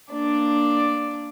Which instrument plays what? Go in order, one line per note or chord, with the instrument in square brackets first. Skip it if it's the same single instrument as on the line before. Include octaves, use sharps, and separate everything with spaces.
[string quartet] A#3 D4 D5